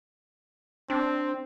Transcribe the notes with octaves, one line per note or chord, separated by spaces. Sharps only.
C4 D4